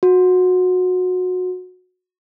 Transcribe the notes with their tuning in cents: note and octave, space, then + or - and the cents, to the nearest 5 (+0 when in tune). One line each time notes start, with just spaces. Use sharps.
F#4 -20